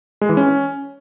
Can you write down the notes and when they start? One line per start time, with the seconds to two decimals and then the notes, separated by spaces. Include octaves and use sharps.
0.21 G#3
0.29 E3
0.37 C#4